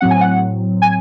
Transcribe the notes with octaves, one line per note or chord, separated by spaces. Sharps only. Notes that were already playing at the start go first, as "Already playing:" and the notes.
A2 F#3 C4 F#5
G#5
F#5
G#5